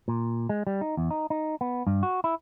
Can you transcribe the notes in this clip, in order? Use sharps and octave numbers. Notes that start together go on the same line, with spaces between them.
A#2
G#3
G3
D#4
E2
D#4
D#4
B3
G2
F#4
E4